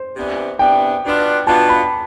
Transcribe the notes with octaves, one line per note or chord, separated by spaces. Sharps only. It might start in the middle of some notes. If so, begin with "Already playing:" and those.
Already playing: C5
C3 E3 B3 D4
C3 E3 B3 D4 G5
B2 B3 D4 F4
B2 B3 D4 F4 A5
B5